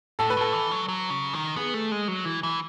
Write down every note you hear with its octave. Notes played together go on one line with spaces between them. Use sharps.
A2 A4
B4
A2 A4
E3
F#3
F#3
C#3
D#3
B3 G#4
A3
G#3
F#3
E3
E3